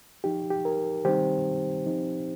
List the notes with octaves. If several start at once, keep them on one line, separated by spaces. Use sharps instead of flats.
F3 D#4 G4
G4
A#4
D#3 G3 C4 D#4 G4 C5
F3 C4 D#4